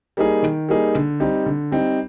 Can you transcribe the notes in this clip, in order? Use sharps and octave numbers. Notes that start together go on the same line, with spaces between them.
G3 A#3 D#4 G#4
D#3
G3 A#3 D#4 G#4
D3
G3 C4 D#4
D3
G3 C4 D#4